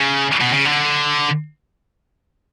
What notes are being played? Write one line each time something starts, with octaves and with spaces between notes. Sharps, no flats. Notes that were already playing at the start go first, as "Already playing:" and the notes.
Already playing: C#3
B2
C#3
D3